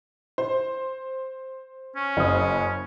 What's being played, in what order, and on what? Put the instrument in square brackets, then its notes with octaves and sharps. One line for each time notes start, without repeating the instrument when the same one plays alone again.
[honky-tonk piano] C5
[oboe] C#4
[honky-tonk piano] F#1 C5 D#6